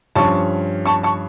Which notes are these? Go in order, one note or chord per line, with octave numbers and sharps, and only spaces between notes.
G2 F3 C#4 A5 C#6
A5 C#6
A5 C#6